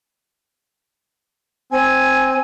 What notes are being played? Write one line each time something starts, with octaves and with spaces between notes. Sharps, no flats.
C4 G#5